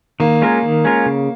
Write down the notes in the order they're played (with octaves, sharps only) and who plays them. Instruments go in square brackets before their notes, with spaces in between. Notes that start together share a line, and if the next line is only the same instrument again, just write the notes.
[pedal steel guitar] D#3 [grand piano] A#3
[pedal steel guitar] G#3 C#4 F4 A#4
D#3
G#3 C#4 F4 A#4
C#3